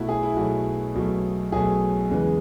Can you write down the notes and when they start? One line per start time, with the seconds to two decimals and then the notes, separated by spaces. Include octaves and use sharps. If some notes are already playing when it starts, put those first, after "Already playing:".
Already playing: B1 B2 F#3 A3 E4 F#4
0.09 G#4
0.23 E4
0.37 B1 B2 F#3 A3 F#4
0.95 B1 B2 F#3 A3
1.52 B1 B2 F#3 A3 G#4
2.10 E2 C#3 E3 G#3